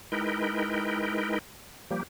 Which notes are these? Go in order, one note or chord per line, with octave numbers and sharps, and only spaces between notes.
G#3 D#4 E4 A#4 B4 G5
F3 G3 A#3 G4